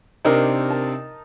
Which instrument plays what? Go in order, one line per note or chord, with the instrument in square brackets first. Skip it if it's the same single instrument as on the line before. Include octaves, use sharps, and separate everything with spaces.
[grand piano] C3 C4 D4 [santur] D#4 A#4
[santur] A5